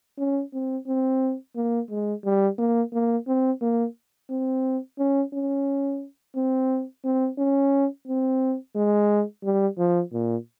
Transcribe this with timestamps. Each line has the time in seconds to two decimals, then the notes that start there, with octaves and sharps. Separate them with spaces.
0.18 C#4
0.53 C4
0.87 C4
1.56 A#3
1.90 G#3
2.24 G3
2.58 A#3
2.93 A#3
3.27 C4
3.61 A#3
4.30 C4
4.98 C#4
5.33 C#4
6.36 C4
7.05 C4
7.38 C#4
8.07 C4
8.75 G#3
9.43 G3
9.78 F3
10.13 A#2